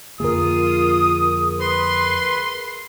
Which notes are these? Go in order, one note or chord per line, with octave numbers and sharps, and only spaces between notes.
F2 D3 A#3 F4 G#4 A#4 D#6
B4 C6